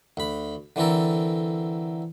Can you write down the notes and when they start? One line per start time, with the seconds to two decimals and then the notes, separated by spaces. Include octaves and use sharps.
0.17 D2 B5
0.76 D3 E3 C4 A4 A#4